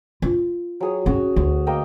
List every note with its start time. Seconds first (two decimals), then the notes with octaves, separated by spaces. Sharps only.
0.22 F4
0.80 F#3 G#4 C#5
1.06 C#4 F#4 G#4 C#5
1.36 D2
1.67 A#3 D#5 G5